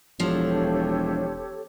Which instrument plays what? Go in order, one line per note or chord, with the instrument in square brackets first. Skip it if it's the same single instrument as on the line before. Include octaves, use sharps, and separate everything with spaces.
[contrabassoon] E1 [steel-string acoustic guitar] F3 D4 [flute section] G4 A4 C#5